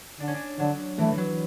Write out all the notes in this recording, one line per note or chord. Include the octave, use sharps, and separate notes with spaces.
D3 D4
C#4
D4
D3 F#3
E3 A3
E3
F#3